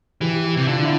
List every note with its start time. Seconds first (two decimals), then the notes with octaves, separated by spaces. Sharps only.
0.21 E3 G4
0.57 C3
0.68 D3 F4
0.79 E4